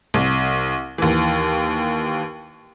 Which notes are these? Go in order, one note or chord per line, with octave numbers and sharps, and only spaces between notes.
C2
D#2 E3